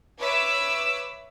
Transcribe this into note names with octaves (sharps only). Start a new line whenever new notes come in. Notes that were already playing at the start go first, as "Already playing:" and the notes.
B4 C#5 E5 D6 E6